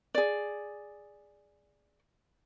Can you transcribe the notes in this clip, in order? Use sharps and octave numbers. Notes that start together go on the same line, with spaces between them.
G#4 D5